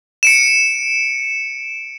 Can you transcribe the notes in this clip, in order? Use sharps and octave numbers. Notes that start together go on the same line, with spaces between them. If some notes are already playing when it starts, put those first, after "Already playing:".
C#7 D7 E7